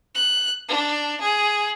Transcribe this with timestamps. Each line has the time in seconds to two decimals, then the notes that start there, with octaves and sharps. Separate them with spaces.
0.15 F#6
0.69 D4
1.21 G#4